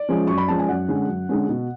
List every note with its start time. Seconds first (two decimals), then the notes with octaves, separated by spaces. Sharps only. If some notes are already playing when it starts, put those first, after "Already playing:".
Already playing: D5
0.09 F3 G#3 C#4
0.27 F#2 C#6
0.38 B5
0.48 F3 G#3 C#4 A5
0.59 G#5
0.69 F#2 F#5
0.88 D3 G#3 C#4
1.08 F#2
1.29 D3 G#3 C#4
1.49 B2